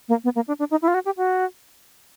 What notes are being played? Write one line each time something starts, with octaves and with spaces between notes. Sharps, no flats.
A#3
B3
A#3
D4
D4
D#4
E4
F4
F#4
G4
F#4